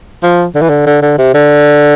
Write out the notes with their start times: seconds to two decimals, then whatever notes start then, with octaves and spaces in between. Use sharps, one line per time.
0.23 F3
0.55 D3
0.62 E3
0.70 D3
0.87 D3
1.02 D3
1.19 C3
1.34 D3